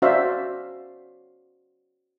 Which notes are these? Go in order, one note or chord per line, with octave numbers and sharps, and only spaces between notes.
C#4 F#4 C5 D5 E5 F5